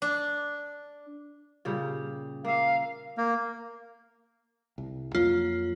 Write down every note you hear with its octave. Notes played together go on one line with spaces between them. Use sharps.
D4
A#2 C#3 G3
A#3 E5 F5
A#3
C2
F2 F#3 A#3 F4